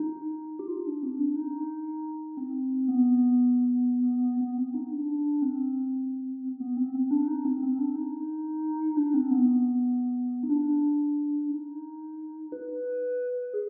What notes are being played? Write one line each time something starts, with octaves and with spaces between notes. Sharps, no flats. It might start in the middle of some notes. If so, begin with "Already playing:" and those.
Already playing: D#4
G4
F4
D#4
D4
C4
D4
D#4
C4
B3
B3
C4
D#4
D4
C4
B3
C4
C4
D4
D#4
C4
C4
D4
D#4
D4
C4
B3
D#4
D4
D#4
B4
G#4